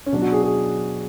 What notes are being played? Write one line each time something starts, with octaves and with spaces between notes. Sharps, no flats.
C#4
B2 F#3 D4
F#4
G#4
G#4